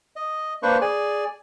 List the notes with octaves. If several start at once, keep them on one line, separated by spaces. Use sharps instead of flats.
D#5
A#3 D4 B4 C5 C#6
G#4 D5 G#5